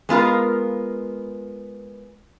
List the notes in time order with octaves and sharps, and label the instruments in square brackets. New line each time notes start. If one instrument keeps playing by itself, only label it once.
[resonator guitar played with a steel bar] G#3 B3 F4 A#4